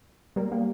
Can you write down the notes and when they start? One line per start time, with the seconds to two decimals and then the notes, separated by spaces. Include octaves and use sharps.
0.36 G3 A#3
0.52 G3 A#3